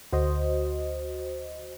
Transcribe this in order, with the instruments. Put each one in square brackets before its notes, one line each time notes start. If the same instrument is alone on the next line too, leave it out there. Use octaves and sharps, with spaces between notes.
[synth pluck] D2 [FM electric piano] F#4 C5 D#5